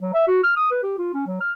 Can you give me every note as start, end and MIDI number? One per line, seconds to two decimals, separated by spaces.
0.01 0.14 54
0.14 0.24 76
0.27 0.40 66
0.44 0.53 89
0.56 0.70 87
0.71 0.79 71
0.83 0.95 67
0.98 1.13 65
1.14 1.24 61
1.27 1.37 54
1.41 1.52 89